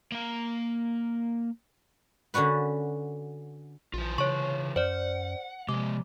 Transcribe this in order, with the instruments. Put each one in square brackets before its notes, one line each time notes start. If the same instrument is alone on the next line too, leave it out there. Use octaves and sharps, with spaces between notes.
[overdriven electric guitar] A#3 F5
[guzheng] D3 C#4 D4 F#4 B4
[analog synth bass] A#1 [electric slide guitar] E3 F4
[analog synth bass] C#3 [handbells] C#5 C#6
[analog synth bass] F#2 [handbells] C5 D5 [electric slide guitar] F#5
[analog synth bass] C3 [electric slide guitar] F3 G#3 [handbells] D6